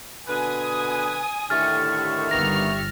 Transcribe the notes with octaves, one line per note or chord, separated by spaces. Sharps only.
B2 D3 B4 G#5 D#6
A2 D3 D#3 G4 E5 C#6 F6 A6
G1 D#3 A#3 B3 F6 A#6